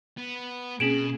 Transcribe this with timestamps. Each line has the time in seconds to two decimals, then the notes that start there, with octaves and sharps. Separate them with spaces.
0.17 B3
0.80 B2 A#3 C4 C#4 G#4 D7 E7 F#7